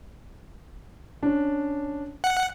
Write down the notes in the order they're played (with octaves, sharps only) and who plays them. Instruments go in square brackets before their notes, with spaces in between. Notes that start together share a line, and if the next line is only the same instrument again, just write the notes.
[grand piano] C#4 D4
[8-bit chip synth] F#5